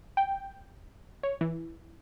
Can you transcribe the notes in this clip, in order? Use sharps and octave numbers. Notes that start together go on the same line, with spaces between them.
G5
C#5
E3